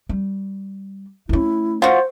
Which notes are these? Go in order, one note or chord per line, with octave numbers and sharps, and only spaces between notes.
G3
A3 C#4 E4
F4 F#4 C5